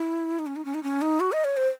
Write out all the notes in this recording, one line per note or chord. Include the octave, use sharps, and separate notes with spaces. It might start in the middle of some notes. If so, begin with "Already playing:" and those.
Already playing: E4
D#4
C#4
D#4
C#4
D#4
C#4
D#4
F#4
D#5
C#5
C5